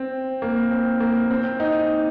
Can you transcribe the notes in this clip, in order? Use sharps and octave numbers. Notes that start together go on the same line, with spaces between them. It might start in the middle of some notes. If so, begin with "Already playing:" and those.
Already playing: C4
A#3
C4
A#3
C4
D#4